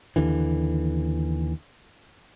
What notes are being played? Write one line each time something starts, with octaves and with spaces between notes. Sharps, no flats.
D#2 D3 E3